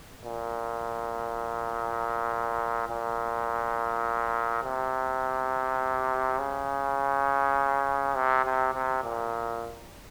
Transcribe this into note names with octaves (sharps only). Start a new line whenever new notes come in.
A#2
A#2
C3
C#3
C3
C3
C3
A#2